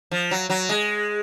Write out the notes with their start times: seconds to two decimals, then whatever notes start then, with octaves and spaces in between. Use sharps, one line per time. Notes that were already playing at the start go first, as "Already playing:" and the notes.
0.11 F3
0.31 F#3
0.50 F#3
0.69 G#3